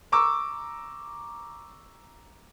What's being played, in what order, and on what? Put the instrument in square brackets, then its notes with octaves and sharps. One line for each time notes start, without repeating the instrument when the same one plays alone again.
[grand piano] A#5 C#6 D6 E6